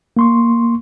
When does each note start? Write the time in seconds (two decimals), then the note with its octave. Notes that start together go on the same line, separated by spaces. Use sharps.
0.17 A#3 C6 C#6